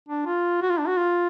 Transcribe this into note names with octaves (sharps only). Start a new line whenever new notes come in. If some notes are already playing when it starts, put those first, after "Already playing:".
D4
F4
F#4
F4
D4
F#4
F4